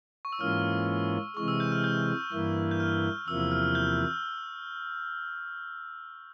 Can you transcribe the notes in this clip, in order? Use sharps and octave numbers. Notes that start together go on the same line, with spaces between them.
C#6
E6
G#2 E3 A#3 C#4 F4 F6
C3 E3 G#3 C#6
E6
G6
F6
G6
G2 E3 A#3 E4
G6
F6
E2 C3 F3 A#3 E4 E6
E6
F6
F6
G6